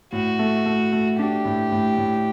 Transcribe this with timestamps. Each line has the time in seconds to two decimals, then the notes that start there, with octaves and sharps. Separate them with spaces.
0.13 A2 F#4
0.39 A3
0.66 A3
0.92 A3
1.19 D4 G4
1.45 A2
1.72 A2
1.98 A2